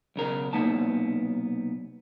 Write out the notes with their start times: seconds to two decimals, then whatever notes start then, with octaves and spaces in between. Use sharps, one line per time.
0.16 B1 C#3 A#4
0.53 B1 C3 A#3 B3 D#4 A5